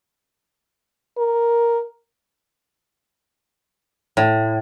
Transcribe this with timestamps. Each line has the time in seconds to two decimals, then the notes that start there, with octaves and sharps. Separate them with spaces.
1.18 A#4
4.17 A2